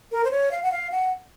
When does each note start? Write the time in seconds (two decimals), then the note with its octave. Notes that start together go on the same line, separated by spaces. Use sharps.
0.12 A#4
0.24 C5
0.31 C#5
0.52 F5
0.63 F#5
0.72 F5
0.92 F#5